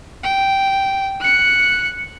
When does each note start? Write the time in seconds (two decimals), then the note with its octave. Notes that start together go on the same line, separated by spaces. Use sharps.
0.23 G5
1.20 F#6 C#7